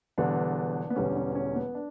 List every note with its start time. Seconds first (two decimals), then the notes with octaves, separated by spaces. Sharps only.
0.18 E1 E2 D3 G3 D4
0.90 B3
0.96 E1 E2 D3 G3 C#4
1.15 C#4
1.35 C#4
1.56 B3
1.75 D4